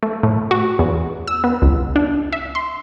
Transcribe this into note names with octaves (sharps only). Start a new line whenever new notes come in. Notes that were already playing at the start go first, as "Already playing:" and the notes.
A3
A2
F#4
E2
E6
B3
C#2
D4
E5
C6